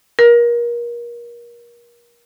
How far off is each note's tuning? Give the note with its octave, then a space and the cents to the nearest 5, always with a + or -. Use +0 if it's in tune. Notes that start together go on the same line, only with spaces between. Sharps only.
A#4 +30